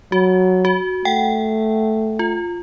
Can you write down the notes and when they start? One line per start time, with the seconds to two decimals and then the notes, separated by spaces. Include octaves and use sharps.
0.12 F#3 F#4
0.65 F#4
1.05 A3 F#5 G5
2.19 F4